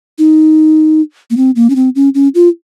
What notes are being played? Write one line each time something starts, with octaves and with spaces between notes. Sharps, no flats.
D#4
A#3
C4
A#3
C#4
C4
C#4
C#4
F4